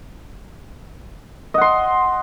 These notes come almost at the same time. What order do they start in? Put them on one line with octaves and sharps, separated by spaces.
D#5 F#5 C6